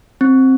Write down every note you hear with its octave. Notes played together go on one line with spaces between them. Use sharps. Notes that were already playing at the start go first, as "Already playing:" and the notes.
C4